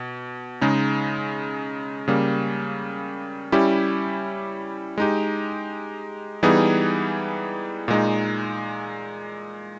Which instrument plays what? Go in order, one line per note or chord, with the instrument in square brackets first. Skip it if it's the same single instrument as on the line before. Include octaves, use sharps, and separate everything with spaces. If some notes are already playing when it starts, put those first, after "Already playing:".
Already playing: [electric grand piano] B2
C#3 G#3 D#4
C#3 G3 A#3
G3 C#4 E4 G4
G#3 D#4 G4
E3 G3 B3 D#4 G#4
A#2 G#3 D#4